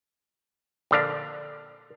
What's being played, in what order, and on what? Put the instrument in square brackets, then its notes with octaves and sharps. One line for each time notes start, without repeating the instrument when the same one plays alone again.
[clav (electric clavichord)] A#1 D3 D4 F5